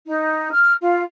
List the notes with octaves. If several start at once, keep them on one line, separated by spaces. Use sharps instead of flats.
D#4
F6
F4